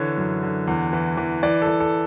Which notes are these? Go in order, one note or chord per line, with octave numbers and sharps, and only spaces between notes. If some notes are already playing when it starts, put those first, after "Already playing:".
Already playing: D3 E3 C#5
F#2
D3
E2
E3
E3
E3 D5
A4
E3
A4